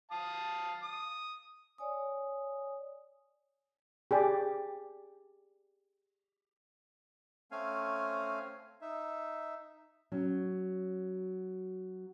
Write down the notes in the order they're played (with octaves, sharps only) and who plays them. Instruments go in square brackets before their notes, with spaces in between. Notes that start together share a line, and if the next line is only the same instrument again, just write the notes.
[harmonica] F5 A5 D#6
D#6
[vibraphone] C#5 D5 G#5 D#6
[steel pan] G4 G#4 D5
[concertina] A3 C4 C#4 F5 G#5
D#4 E5
[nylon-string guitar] F#3 C#4